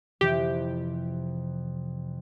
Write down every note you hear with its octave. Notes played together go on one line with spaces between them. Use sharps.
F2 C3 E3 G4